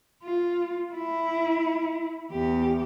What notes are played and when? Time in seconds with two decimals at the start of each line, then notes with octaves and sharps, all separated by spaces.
0.23 F4
0.94 E4
2.32 E2 G4